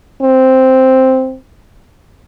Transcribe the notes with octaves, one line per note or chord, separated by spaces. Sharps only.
C4